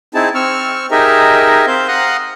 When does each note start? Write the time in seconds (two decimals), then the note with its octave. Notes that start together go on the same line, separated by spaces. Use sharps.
0.14 C4 D#4 E4 G#4 A5
0.35 C4 C#6 E6 F6
0.91 D#4 G4 G#4 A#4 D#5 E5
1.67 C4 C5 F5 G6
1.88 F5 F#5 A#5 C6 D#6 F#6